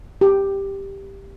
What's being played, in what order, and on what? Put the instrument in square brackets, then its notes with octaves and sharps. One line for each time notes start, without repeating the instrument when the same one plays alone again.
[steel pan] G4